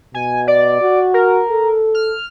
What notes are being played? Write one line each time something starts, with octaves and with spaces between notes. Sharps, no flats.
B2 G#5
D5
F#4
A#4
A4
F6